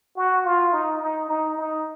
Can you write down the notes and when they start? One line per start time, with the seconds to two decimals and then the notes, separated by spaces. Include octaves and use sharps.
0.17 F#4
0.45 F4
0.73 D#4
1.01 D#4
1.29 D#4
1.58 D#4